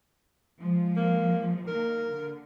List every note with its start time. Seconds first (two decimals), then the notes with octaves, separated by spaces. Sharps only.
0.59 F3 G#3
0.96 A#3
1.67 D#3 A#3 A#4
2.06 D3